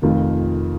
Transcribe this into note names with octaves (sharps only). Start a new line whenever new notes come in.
F1 F2 D#3 F4